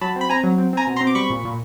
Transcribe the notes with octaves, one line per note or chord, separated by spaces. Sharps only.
F#3 A5 B5
C4
B5
C4 G#5 A#5
F#3
C4
C4 G#5 A#5
B2
A#5 C6
C4
D6
G3 B5 C#6
A#2
A#2